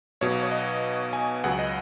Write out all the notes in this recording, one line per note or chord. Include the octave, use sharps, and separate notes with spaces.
B1 B2 F#3 C#5
C#5
D#5
G#5
C#2 C#3 F#3 F#5
D#5